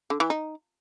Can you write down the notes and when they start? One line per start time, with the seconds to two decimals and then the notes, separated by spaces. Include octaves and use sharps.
0.10 D3
0.20 E3
0.30 D#4